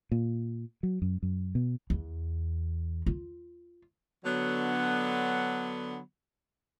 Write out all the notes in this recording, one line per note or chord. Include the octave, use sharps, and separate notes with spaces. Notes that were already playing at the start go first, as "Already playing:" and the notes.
A#2
F#3
F#2
F#2
B2
E2
F4
D3 F#3 B3